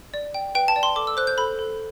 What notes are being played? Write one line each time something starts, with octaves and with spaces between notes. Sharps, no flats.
D5
G5
B4 G5
A5
D5
C6
A4 D6
E6
C5 F#6
G6
A4 B5
A4